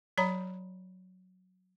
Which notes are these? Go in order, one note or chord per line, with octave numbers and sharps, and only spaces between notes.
F#3 C#5 A#5 B5